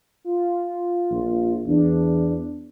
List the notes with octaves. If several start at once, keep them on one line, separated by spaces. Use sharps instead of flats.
F4
A#1
E2 D4